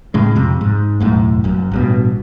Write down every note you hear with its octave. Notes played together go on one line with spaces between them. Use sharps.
A2 C#3 G#3
F2 C3
G#2
E1 F#2 A2
F#1 F#2
A1 G2 B2